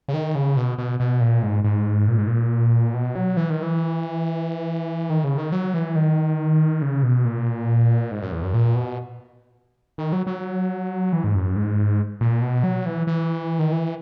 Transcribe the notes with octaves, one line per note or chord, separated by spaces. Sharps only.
C#3
D#3
C#3
B2
B2
B2
A#2
G#2
G#2
A#2
G#2
A#2
B2
F#3
E3
D#3
E3
D#3
C#3
D#3
F#3
E3
D#3
C#3
B2
A#2
G#2
F#2
E2
F#2
A#2
B2
D#3
F#3
F#3
E3
G#2
F#2
G#2
A#2
B2
F#3
E3
E3
D#3
E3